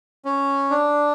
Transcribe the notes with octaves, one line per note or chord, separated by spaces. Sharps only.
C#4
D4